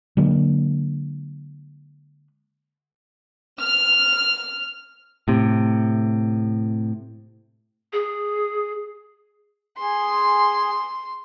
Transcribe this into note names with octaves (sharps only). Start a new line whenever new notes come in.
D3 F#3 G#3 A#3
F6
A2 C3
G#4
G#4 C6